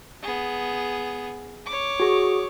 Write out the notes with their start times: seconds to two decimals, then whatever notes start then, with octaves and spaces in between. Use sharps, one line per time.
0.23 B3 G#4
1.66 C#5 D6
2.00 F#4 G#4